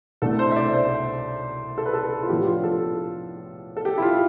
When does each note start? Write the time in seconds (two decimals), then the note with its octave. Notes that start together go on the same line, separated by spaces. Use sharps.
0.22 C2 B2 A3 D4 A4
0.39 C5
0.51 E5
0.56 D5
0.73 C5
1.78 A4
1.86 B4
1.93 A4
2.23 F4
2.29 A2 F3 B3 D4 G4
2.43 G4
2.47 F4
2.64 A4
3.77 A4
3.85 G4
3.98 E4
4.02 F4